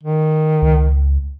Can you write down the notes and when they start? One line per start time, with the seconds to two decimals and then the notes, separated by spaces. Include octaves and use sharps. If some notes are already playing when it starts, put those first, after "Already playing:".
0.03 D#3
0.62 C#2